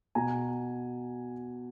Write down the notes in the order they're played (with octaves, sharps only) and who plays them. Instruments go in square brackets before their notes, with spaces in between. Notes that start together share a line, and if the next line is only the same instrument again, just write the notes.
[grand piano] B2 G#5 A#5